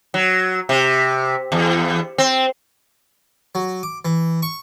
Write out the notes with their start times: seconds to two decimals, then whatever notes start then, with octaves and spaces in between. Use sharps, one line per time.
0.14 F#3
0.69 C3
1.52 E2
2.18 C4
3.55 F#3
3.83 D6
4.05 E3
4.42 C#6